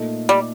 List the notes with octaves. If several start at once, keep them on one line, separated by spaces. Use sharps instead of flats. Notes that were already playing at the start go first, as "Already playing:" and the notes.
Already playing: A#2 A3 D#4 A4
G3